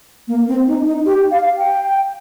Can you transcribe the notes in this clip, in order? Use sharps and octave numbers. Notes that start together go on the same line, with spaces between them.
A#3
C4
D#4
D#4
G4
F5
G5